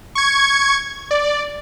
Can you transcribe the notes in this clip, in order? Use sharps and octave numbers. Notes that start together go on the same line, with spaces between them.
C#6 G#6
D5